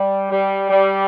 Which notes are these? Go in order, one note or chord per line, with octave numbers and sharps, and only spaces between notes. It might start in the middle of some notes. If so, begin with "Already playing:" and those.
Already playing: G3
G3
G3